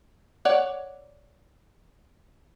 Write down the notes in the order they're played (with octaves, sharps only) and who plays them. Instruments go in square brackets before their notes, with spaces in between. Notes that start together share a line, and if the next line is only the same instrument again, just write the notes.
[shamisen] C#5 D5 F#5